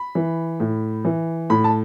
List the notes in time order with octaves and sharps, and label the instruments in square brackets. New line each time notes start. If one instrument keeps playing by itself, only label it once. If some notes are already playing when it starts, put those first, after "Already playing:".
Already playing: [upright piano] B5
E3
A2
E3
A2 B5
A5